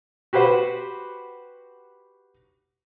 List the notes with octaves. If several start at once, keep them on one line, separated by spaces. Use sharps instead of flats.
F#4 G4 B4 C5 F#5